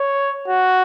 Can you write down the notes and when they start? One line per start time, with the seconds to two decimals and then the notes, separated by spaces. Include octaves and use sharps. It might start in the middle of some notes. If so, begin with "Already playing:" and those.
Already playing: C#5
0.48 F#4